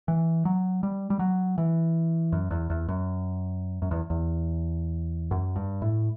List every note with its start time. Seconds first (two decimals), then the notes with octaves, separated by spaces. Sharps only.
0.08 E3
0.45 F#3
0.83 G3
1.10 G3
1.19 F#3
1.58 E3
2.32 F#2
2.51 E2
2.70 E2
2.88 F#2
3.82 F#2
3.91 E2
4.10 E2
5.31 F#2
5.56 G2
5.82 A2